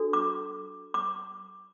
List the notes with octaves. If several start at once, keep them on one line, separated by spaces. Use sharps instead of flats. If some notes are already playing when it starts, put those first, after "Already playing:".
Already playing: D4 F#4 A4
D6
D6